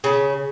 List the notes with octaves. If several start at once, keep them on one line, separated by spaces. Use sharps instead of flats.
C#3